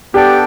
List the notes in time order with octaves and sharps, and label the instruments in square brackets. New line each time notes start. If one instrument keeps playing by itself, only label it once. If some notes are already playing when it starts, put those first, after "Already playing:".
[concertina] B3 D4 A4 D5 G5 [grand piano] G4